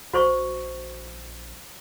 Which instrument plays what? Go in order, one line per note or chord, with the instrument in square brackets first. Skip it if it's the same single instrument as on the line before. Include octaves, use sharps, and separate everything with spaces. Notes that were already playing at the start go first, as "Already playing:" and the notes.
[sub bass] A#1 [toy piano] F#4 C5 C#6